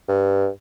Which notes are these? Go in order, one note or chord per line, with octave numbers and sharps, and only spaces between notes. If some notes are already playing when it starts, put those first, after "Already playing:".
G2